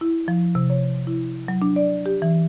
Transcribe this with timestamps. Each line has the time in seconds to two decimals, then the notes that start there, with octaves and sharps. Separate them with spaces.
0.01 E4
0.28 F3
0.55 C3
0.70 C#5
1.07 E4
1.48 F#3
1.62 D4
1.76 D5
2.06 G4
2.22 E3